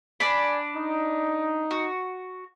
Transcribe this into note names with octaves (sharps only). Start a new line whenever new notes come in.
D4 D5 G#5 B5
D#4
F#4